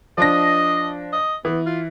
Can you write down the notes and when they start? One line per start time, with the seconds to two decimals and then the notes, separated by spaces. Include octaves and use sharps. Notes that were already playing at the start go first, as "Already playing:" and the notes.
0.18 F3 D4 D#5 A#6
1.13 D#5
1.45 E3 B3
1.66 F4